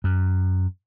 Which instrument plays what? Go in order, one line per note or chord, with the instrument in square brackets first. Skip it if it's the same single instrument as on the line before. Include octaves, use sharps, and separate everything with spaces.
[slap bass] F#2